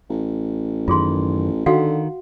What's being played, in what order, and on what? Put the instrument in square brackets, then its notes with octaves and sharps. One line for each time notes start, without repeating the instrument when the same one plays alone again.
[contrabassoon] A1
[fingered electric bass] F#2 D#3 [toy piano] F4 G#4 C6
[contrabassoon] D3 [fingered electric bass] D#3 [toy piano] F#4 F5 F#5